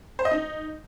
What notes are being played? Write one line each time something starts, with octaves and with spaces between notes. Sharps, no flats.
C5
D#5
D#4